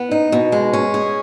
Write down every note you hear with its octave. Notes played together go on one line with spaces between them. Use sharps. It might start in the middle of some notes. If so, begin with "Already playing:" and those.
Already playing: B3
D#4
B2
G#3
C#4
G#4